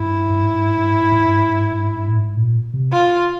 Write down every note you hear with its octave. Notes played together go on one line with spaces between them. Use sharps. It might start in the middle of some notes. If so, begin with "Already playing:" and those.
Already playing: G2 E4
G2
G#2
G2
G#2
G2
G#2
G2
G#2
G2
G#2
G2
G#2
G2
G#2
G2
A2
G#2
A#2
C3
F4